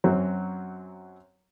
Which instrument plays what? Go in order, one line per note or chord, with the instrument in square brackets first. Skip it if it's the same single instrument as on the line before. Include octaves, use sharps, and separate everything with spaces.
[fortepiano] F#2 F#3 C4